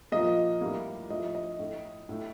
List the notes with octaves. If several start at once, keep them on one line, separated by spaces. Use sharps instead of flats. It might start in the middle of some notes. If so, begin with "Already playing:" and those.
A#2 F3 A#3 D#5
A2 G3 A#3
A2 F3 A3 D#5
D#5
A2 A3
A2 A3